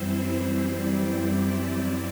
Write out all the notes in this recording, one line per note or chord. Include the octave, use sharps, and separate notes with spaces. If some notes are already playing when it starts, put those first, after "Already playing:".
Already playing: F#2 E3 G3 C4 E4 C5
D5
F#2 F#3 C4 D5